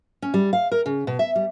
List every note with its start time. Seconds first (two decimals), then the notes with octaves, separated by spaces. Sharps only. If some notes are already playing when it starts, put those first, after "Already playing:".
0.22 C#4
0.34 G3
0.53 F5
0.72 A#4
0.86 C#3
1.07 B2
1.19 E5
1.35 G3